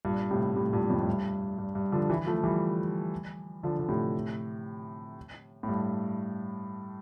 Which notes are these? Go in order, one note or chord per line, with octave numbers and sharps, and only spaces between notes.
G2 A#2
A2 C3
A2 C3
G2 A#2
F2 A2
A2
G2
G2
G2
D3 F3
E3 G3
F3 A3
E3 G3
D3 F3
D3
A2 C3
A2
G2